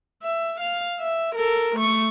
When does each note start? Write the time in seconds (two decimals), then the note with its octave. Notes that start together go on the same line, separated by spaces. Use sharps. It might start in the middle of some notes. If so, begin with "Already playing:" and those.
0.22 E5
0.60 F5
1.00 E5
1.35 A4 A#4
1.75 A3 C#6